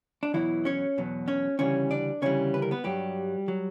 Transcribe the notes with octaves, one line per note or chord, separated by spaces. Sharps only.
D4
E2 B2 E3 F#3 E4
C#4 C#5
E2 B2 F#3
C#4 C#5
D2 C#3 E3 G3 C#4 C#5
D4 D5
D2 C#3 E3 G3 C#4 C#5
B4
A#4
B3 B4
G2 F#3 G3 G4
F#3